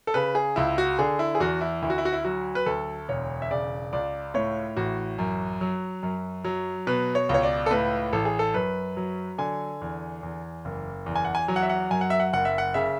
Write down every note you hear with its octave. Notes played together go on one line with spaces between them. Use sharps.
A4
C#3 B4
G#4
C#2 E4
F#4
D3 G#4
E4
G#4
E2 F#4
E4
D2 E4
F#4
E4
F#4
E4
F#3 F#4
B4
D2 A4
E1 C#5
E5
C#3 D5
C#2 D5
A2 C#5
A1 F#4
F#2
F#3
F#2
F#3
B2 B4
C#5
C#2 C#5
D5
A4
A2 B4
A1 A4
G#4
A4
F#2 B4
F#3
D3 G#5
E2
E2
F#1
E2
G#5
F#5
G#5
F#3 G#5
F#5
E5
F#5
F#2 G#5
F#5
E5
F#5
F#1 F#5
E5
F#5
C#3 E5